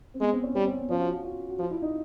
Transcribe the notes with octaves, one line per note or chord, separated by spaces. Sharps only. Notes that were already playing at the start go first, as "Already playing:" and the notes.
C4
G#3 B3
C4
C#4
G3 C#4
C4
B3
F3 C#4
F#4
F4
F#4
F4
F#4
F3 F4
E4
D#4